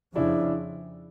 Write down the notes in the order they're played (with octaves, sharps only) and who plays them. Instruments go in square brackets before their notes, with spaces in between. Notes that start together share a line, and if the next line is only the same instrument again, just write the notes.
[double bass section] F2 C#3 F3 [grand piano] D4 E4